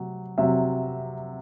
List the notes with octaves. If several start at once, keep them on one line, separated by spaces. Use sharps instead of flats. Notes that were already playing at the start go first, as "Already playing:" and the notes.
Already playing: C3 F#3
C3 F#3 E5